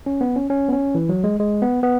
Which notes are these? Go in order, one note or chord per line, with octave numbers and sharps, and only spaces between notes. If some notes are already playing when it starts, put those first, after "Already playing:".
C#4
B3
C#4
C#4
B3
C#4
E3
F#3
G#3
G#3
B3
B3